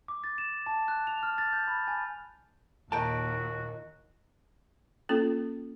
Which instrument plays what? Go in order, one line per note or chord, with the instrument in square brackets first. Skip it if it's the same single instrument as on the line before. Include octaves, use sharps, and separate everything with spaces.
[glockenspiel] D6
A6
E7
A5
F#6
F7
F6
A6
G6
B5
G#5
[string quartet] D#2 A#2 [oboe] F#4 [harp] A#4 D#5 [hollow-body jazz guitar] G5 A5
[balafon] A#3 C#4 F4 A4